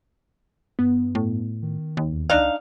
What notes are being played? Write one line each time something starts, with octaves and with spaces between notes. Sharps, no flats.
G2 B3
A2
D#3
D#2
E2
C#2 D4 D#4 F5